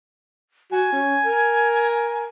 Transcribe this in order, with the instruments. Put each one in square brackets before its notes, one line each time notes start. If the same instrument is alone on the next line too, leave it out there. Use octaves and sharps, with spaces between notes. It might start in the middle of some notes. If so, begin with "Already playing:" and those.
[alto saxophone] F#4 [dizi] G#5
[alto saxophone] C#4
A#4